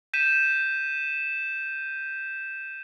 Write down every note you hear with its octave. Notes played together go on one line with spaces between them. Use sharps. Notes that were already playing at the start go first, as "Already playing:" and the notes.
G6 B6 D#7 E7